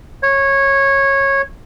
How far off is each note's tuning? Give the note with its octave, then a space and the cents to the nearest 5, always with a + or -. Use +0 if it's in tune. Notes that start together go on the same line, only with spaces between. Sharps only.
C#5 -15